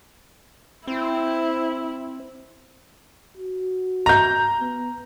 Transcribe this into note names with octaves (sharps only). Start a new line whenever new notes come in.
C4 E4
F#4
A#5 G6
B3